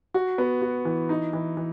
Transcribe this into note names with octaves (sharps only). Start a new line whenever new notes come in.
F#4
B3
F#4
E3
D#4
E3
E3